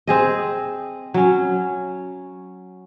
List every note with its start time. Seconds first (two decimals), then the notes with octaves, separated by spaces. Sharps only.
0.07 C4 G#4 D#5
1.14 F#3 C#4